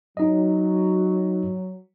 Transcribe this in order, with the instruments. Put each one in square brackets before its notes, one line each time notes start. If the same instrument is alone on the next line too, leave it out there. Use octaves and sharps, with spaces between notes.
[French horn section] F#3 [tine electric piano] D#4 D#5